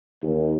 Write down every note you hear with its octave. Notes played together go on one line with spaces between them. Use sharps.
D#2